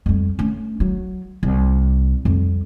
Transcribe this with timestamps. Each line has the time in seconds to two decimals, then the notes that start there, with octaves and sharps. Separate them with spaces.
0.06 F2 G3
0.39 A3 C#4
0.80 F#3
1.43 C2
2.25 F2 G3